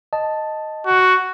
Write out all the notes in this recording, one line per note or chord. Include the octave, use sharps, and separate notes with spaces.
D#5 A5
F#4